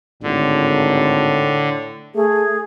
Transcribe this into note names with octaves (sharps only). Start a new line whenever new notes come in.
G#1 A2 D3
A3 G#4